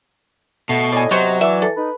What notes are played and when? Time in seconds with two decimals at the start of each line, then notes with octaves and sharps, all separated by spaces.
0.69 B2 A3
0.92 A2 D5 D#5 G#5
1.11 C3 F#3 B3 C5 C#5
1.41 E3 D5 E5
1.62 A4
1.76 D#4 B4